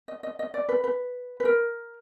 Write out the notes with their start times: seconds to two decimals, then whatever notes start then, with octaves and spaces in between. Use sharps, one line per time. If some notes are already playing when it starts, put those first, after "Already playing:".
0.08 D#5
0.23 D#5
0.39 D#5
0.54 D5
0.69 B4
0.84 B4
1.40 B4
1.45 A#4